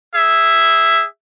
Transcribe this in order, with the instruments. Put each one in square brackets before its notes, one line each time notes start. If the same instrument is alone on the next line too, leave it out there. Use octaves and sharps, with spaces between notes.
[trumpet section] G#4 E5